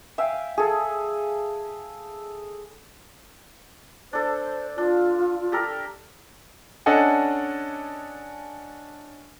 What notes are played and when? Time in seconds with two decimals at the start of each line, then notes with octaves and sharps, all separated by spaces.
0.18 E5 F5 G5 G#5
0.58 G#4 A4
4.13 D4 A4 C5
4.78 D4 F4
5.52 G4 A4 A#4
6.86 C#4 D4 A4 D#5 F#5 G#5